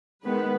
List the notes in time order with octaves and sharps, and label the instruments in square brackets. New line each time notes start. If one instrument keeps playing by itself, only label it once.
[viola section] D#3 G#3 B3 B4